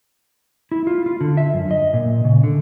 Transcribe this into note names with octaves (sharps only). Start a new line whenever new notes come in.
E4
F4
F4
D3
E5
F#2
D#5
A#2
C#3
D3